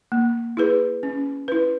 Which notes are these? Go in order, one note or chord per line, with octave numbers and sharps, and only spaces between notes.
A#3
E4 G#4 B4
C#4
E4 B4